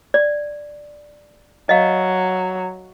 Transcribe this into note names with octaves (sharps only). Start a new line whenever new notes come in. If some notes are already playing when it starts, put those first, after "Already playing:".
D5
F#3 D#5 F5